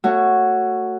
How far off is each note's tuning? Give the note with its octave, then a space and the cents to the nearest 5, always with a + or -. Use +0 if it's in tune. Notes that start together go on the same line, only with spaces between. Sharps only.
A3 +25 F#4 +0 C#5 +0